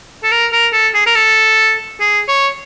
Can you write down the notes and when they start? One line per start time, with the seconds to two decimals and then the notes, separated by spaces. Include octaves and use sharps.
0.24 A4
0.32 A#4
0.53 A#4
0.73 A4
0.94 G#4
1.07 A#4
1.15 A4
2.01 G#4
2.28 C#5